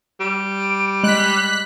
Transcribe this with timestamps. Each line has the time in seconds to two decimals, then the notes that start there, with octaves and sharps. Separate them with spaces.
0.20 G3 D7
1.04 G#3 F#6 B6